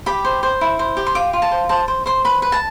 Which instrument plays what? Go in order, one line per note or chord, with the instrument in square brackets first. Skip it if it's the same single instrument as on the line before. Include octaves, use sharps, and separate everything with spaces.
[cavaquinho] G4 B5
C5
C5
E4
C5
G4
C6
F4 D6
F4
A5
C5
C5 A5
C5
C5 C6
B4 B5
B4
A5